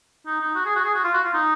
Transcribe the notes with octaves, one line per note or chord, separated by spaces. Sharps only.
D#4
D#4
F#4
G#4
F#4
G#4
F#4
F4
F#4
F4
D#4